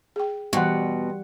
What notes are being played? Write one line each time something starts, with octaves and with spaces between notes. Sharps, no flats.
G#4 G5
B2 E3 G3 F#4 F#5 G5 C6 C#6